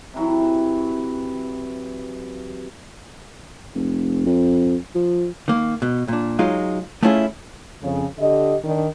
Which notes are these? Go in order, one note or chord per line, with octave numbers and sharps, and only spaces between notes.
C3 E3 F#3
F1
F2
F3
D#3 A#3
B2
A#2 D4
F#3 G#3 D#4 F4
A3 B3 C#4 E4 F4 G#4
F2 C#3
D3 G4 D#5
D#3 D4